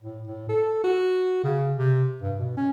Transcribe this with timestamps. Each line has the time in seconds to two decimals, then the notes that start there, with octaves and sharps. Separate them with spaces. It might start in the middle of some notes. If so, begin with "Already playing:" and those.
0.02 A2
0.27 A2
0.49 A4
0.84 F#4
1.44 C#3
1.76 C3
2.22 G2
2.39 B2
2.57 C#4